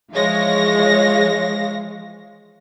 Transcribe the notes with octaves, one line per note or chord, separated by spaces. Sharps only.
E3 F3 G#3 C#5 F5 A#6